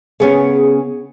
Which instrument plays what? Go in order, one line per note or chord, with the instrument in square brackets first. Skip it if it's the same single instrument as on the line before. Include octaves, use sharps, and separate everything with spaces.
[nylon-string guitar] C#3 B3 C#4 [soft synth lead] G#4